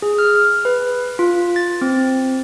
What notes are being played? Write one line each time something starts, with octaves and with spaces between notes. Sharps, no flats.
G#4
F6
B4
F4
A6
C4